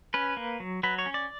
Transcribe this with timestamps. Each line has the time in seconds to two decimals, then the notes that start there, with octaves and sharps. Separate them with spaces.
0.14 C#4 B4
0.37 A#3
0.60 F#3
0.83 F#3 B4
0.99 C#5
1.06 C#4
1.14 D5